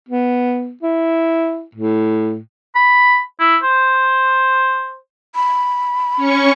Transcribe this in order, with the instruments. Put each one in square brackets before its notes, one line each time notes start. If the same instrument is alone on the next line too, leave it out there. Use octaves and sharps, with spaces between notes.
[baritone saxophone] B3
E4
A2
[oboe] B5
E4
C5
[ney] B5
[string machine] C#4 C#6